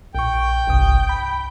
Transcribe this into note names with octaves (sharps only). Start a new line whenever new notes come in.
A#1 G5 C#6
G1 C2 D#6
B5